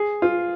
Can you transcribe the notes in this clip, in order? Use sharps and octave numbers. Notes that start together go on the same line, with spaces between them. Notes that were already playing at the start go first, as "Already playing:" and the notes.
Already playing: G#4
F4